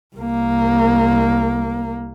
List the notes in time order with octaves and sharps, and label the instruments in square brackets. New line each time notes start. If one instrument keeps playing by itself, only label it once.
[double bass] C2 A#3